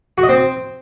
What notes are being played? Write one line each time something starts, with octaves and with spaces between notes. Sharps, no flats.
F#4
D#5
C4